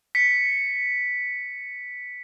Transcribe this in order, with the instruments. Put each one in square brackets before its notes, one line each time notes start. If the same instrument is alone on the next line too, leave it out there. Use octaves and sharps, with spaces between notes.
[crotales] B6 C#7